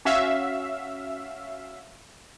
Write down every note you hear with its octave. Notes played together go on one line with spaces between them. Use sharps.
C#4 F#4 E5 F5